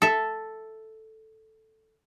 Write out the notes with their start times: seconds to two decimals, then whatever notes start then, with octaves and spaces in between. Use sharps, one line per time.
0.02 A4 E5